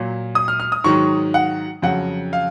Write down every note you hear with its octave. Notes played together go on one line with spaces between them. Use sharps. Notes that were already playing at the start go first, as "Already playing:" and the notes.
Already playing: A#2 F#3
D#6
F6
F6
D#6
G#2 D#3 F#3 C#6
F#5
F2 C#3 F#3 F#5
F5